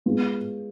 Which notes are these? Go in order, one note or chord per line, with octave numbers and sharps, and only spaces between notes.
G#3 B3 F4